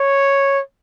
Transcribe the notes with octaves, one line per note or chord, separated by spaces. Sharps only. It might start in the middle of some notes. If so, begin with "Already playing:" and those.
Already playing: C#5